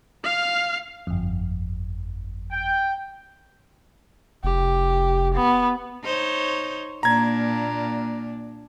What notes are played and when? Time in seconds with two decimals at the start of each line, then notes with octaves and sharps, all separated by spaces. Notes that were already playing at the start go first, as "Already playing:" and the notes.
0.24 F5 F6
1.07 G1 F2
2.51 G5
4.44 F1 G4
5.34 B3
6.03 D#4 C5 C#5
7.03 A#2 A#3 D4 A#5 G#6